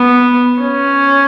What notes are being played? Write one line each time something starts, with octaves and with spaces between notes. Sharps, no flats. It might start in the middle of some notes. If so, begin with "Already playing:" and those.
Already playing: B3
C#4